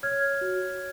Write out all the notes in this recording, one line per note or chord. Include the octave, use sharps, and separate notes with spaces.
C#5 F6 G#6
F#4